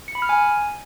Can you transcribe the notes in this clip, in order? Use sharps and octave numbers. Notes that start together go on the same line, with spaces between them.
C#7
B5
F6
G#5